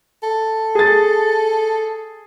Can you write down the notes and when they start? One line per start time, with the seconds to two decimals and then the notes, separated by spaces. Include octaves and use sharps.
0.23 A4
0.75 G#4 A6